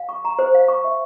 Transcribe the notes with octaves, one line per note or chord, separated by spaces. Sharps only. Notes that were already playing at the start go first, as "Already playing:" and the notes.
Already playing: F5
C#6
A#5
C5
F5
C#6
E5